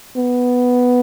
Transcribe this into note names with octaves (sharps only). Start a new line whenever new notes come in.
B3